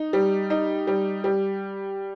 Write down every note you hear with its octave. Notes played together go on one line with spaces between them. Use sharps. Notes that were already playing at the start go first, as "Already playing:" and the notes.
Already playing: D#4
G3
D#4
G3
G3